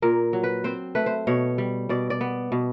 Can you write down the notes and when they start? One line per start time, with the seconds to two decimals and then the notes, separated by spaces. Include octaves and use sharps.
0.02 A#2 A#4
0.33 F#3
0.43 B4
0.64 C4 C5
0.95 A3 B4
1.06 C5
1.27 B2 C#5
1.58 G3
1.89 B2 D5
2.10 D5
2.21 B3
2.52 B2